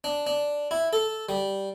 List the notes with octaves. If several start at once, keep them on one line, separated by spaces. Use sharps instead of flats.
D4
D4
E4
A4
G3